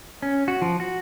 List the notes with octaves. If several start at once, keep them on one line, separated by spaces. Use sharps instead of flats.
C#4
F#4
F3
F#4